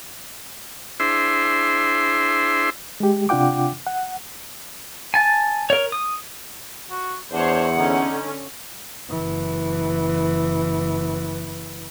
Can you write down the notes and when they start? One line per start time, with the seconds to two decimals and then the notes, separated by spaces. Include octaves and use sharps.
1.00 D4 E4 G#4 C5 E5 C6
3.00 G#3 G4
3.29 C3 D4 F4 F#5 G5 D6
3.87 F#5
5.14 G#5 A5
5.70 A#4 C#5
5.92 D#6
6.90 F#4
7.33 E2 D4 C5 C#5 F#5
7.78 D3 C#4 D#4
9.09 F#1 E3